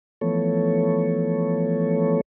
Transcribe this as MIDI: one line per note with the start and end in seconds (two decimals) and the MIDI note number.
0.21 2.21 52
0.21 2.21 53
0.21 2.21 57
0.21 2.21 59
0.21 2.21 69
0.21 2.21 73